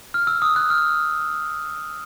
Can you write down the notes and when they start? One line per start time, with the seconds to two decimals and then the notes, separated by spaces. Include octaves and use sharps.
0.14 F6
0.27 E6
0.42 D#6
0.56 F#6
0.70 F6